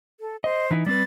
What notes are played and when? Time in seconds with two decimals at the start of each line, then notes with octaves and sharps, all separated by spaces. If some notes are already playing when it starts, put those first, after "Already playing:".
0.20 A4
0.44 C5 D#5
0.71 E3 D#4 E4
0.86 G3 C4 B4 A6